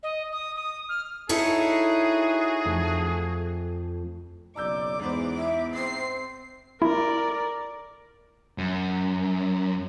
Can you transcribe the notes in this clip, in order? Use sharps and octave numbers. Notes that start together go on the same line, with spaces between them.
D#5
D#6
D#6
F6
D#4 E4 F#4 G#4 A4 C#5
F2 A3
F#1 B1 D5 A#5 D6 E6 G6
E2 G#2 B3 C5
E5
C4 C7
E4 A#4 D5
F#2